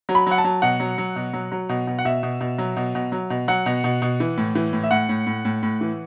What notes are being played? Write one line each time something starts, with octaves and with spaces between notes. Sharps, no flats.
F#3
B5
F#3 F#5
A5
F#3
B2 F#5
F#3
F#3
B2
F#3
F#3
B2
B2
F#5
B2 E5
B2
B2
F#3
B2
B2
F#3
B2
F#3 F#5
B2
B2
B2
E3
A2
E3
A2
E5
A2 F#5
A2
A2
A2
A2
E3